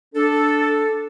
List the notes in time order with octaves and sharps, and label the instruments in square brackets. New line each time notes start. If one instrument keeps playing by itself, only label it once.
[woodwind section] D4 A4